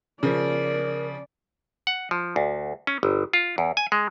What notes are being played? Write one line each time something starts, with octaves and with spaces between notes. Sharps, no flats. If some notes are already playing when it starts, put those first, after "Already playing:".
C#3 F3 A#4 D5
F#5
F3
D2
C#4
G1
F4
E2
G#5
G#3